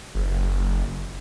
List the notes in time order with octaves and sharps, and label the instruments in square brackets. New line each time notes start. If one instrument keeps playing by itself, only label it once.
[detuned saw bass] F#1